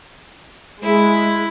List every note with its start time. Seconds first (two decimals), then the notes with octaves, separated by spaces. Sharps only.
0.83 G#3 E4